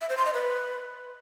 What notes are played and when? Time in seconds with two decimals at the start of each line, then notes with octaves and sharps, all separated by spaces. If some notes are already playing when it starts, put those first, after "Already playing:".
0.01 E5
0.09 C5
0.17 C6
0.25 D#5
0.33 B4